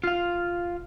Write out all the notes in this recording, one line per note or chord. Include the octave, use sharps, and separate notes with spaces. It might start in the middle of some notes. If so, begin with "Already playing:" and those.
F4 F5